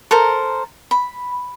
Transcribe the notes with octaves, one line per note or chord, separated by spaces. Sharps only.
A4 A#4 C5 A#5
B5